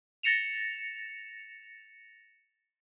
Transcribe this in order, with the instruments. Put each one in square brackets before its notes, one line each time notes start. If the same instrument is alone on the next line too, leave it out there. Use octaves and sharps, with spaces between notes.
[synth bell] A6 A#6 C#7 E7 F7